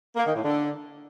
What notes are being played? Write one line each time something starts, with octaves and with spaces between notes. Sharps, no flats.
A#3
D#3
A2
D3